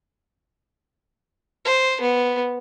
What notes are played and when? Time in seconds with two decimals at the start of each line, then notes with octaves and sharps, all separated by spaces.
1.65 C5
2.01 B3